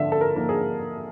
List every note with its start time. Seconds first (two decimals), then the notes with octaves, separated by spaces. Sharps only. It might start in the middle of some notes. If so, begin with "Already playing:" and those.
Already playing: D3 F3 A#3 E5
0.12 A4
0.21 A#4
0.35 F3 A#3 D#4
0.49 G#4